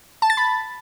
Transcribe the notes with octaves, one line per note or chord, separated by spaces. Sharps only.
A5
A6
B5